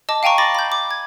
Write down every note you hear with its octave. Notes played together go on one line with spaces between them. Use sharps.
D#5 A5 D6
F5 G5 G#5 A#5 C#6
B5 D6 A6 A#6
B5 G6
D6
G#6